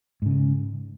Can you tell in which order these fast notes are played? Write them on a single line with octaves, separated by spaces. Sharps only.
G#2 C#3 G#3